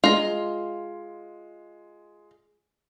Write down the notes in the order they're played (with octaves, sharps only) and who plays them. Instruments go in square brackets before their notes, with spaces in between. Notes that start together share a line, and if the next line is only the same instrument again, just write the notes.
[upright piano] G#3 [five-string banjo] F4 A#5